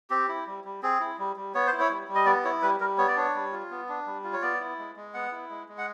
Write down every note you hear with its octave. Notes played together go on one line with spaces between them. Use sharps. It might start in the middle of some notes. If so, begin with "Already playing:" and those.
C4 G4
E4
G3
G3
C4 G#4
E4
G3
G3
B3 C#5
C5
E4
C#5
G3
G3
D#5
B3 D5
E4 C#5
G3 B4
G3 A#4
B3 C#5
D5
D4 C#5
G3
F4
B3
D4
G3
F4
C#5
B3 D5
E4
G#3
G#3
B3 F#5
E4
G#3
G#3
F#5